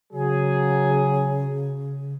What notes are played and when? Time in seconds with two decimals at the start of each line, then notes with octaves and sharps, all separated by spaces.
0.13 C#3 F#3 G#4